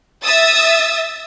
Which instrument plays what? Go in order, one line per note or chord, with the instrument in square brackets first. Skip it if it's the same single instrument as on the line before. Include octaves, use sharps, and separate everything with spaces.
[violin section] E5 D#6 E6 A6